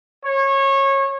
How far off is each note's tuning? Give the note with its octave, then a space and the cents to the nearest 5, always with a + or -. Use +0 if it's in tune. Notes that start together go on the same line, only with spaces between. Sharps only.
C#5 -25